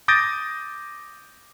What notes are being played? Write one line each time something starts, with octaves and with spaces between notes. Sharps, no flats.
D6 D#6 G6 A6 A#6 D7